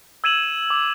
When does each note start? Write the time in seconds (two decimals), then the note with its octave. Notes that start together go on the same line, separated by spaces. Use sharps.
0.24 E6 G#6 D#7 E7 F#7
0.70 D6